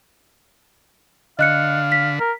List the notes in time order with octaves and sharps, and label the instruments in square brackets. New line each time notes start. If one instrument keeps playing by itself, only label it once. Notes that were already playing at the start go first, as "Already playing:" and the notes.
[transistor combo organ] D3 [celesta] D#5 F#6 C#7 [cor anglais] F5
[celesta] B6
[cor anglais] A#4